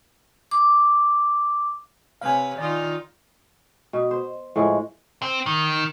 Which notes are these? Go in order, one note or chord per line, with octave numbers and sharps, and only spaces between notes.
D6
C3 B4 C#5 F5 G#5
D#3 D#4 F4 D5
B2
C5
A2 F3 G#3
C4
D#3